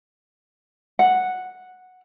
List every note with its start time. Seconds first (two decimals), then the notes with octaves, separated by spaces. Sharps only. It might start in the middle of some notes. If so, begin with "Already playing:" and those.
0.99 F#5